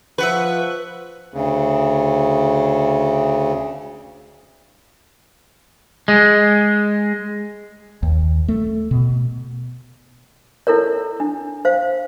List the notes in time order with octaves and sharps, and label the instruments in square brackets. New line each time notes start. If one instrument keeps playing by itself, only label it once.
[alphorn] F3 [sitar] B4 [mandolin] E5 F#5 C#6
[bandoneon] D2 C#3
[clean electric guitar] G#3
[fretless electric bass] D#2
A3
B2
[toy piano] E4 A4 A#4 C#5
D4
C5 F5